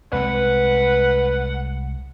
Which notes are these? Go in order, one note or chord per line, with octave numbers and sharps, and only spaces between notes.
C2 G#3 C4 B4 F#5